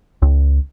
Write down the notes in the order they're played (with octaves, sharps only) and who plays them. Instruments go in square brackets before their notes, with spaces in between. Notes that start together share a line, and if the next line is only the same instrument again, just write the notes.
[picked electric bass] C#2